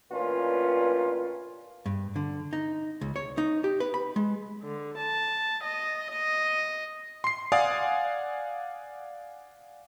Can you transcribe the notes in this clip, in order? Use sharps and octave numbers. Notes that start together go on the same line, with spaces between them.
A1 A#2 C#4 D4 F4 B4
G2
D3
D#4
C#2
C#5
D#4
G4
B4
B5
G#3
D3
A5
D#5
D#5
C6 C7
D5 F5 F#5 G#5 D#6